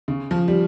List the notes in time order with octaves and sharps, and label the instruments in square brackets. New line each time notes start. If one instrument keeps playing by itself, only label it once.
[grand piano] C#3
F3
G3